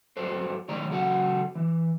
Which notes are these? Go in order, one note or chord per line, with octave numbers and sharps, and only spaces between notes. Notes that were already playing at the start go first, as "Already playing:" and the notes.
G2 F#3 A4 C5
A2 D#3 C#5 D5 A#5
F#2 C#3 F#4 A4 F#5
E3